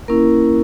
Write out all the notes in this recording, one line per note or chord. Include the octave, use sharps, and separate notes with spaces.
A#3 C#4 E4 A#4